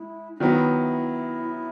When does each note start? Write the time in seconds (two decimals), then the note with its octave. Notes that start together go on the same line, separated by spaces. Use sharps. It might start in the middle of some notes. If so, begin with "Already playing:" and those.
Already playing: G#3 E4
0.36 D#4
0.40 D#3 F#3 B3 E4